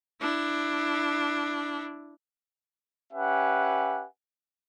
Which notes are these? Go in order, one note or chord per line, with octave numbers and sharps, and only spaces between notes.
D4 E4
C#4 G4 B4 E5 F#5 G#5